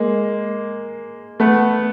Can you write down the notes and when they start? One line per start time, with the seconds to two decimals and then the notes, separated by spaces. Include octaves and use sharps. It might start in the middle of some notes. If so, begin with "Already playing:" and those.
Already playing: G#3 A#3
1.40 A3 B3